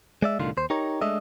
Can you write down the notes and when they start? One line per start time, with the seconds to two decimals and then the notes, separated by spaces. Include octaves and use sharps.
0.22 G#3 D5 E5
0.39 C2 A2 D3 D#3 F4
0.57 D#2 C5
0.70 D#4 G4 A#4 C#5
1.01 G#3 A3 D4 D#5 E5